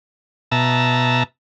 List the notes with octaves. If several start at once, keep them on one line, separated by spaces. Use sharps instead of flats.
B2 E5 A5 A#5